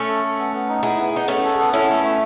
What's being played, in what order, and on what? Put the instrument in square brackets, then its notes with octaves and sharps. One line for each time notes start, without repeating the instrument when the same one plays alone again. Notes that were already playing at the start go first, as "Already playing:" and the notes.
Already playing: [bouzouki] A3 C#4
[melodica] A4
A4
B3
B3
D#4
[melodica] B3 [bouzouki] E4 G#4
[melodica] B3
[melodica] B3 [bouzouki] D#4
[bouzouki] A3 C#4 [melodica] B3
[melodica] A4
B3
[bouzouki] C#4 E4 [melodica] A4
[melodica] A3
A3